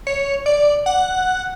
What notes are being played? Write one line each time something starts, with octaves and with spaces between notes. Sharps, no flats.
C#5
D5
F#5